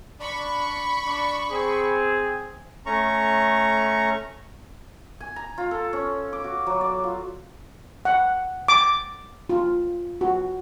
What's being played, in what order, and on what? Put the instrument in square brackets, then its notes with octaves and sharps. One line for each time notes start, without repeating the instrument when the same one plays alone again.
[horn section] D4 [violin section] B5 C#6
[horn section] D4
C4 G#4
[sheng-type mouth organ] A3 C#4 A#5 C#6
[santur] G#5
A#5
F4
A4
C#4
D6
F#4
F#3
D5
F4
[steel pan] F#5
D6
F4
F#4